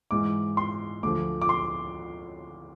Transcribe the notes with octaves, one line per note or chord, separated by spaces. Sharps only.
G#2 E3 D6
C6
D2 D3 F3 D6
D6
C6